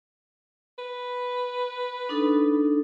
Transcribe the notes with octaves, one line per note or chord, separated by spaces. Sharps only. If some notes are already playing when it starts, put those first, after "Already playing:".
B4
D4 D#4 A4